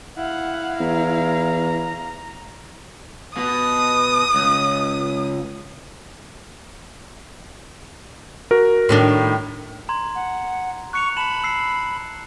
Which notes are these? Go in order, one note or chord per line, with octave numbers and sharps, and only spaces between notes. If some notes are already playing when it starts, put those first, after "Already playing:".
E4 F5 F#5
E2 A#5
B2 D#6
C#2
F#4 A#4
A2 D#3 D4
A#5 C6 G#6
F#5
C#6 F#6 C#7 F7
A5 B5 E7 F#7
E6 C7